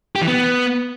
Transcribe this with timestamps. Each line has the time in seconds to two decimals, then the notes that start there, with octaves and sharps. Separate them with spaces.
0.16 G4
0.22 E3
0.28 B3